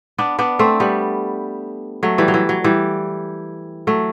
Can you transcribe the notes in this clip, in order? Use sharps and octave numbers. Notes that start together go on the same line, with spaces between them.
B3 D4
B3 D4
A3 C4
G3 B3
F#3 A3
E3 G3
F#3
E3
F#3
E3 G3
F#3 A3